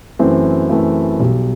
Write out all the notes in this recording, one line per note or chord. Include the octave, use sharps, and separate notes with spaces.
F#2 E3 A3 C4 E4
F#2 E3 A3 C4 E4
B1 B2 G3